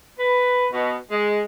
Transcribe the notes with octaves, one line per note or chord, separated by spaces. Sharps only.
B4
B2
G#3